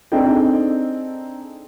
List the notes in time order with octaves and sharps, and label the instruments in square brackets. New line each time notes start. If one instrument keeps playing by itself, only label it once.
[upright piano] C4 D4 D#4 G#4 A4 G5